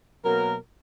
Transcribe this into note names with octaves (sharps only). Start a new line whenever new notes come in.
B2 F#3 A#3 A#4